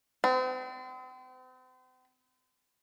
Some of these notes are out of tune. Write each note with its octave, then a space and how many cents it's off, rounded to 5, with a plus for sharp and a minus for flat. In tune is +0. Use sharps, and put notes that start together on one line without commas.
C4 -40